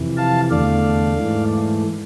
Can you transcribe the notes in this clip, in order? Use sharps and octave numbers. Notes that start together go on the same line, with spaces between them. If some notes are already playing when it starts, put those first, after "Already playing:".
Already playing: F2 C3 E3
F5 A5
E2 D3 A3 D5 F5
G#2 E3 A3